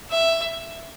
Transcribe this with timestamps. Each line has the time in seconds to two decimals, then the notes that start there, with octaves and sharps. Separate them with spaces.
0.11 E5